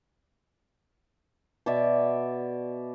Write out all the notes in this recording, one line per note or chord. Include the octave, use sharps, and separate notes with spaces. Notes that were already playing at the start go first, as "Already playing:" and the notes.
B2 D5 E5 D6